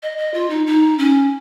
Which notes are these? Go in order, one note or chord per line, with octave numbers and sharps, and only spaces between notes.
D#5
D#5
F4
D#4
D#4
C#4